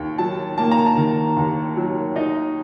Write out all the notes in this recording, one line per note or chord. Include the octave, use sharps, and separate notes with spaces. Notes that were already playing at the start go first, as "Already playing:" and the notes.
Already playing: D#2 D#3 G5
F#3 A5
A#3 A5
A#5
A5
D#3
D#2
F#3
D#4 D#5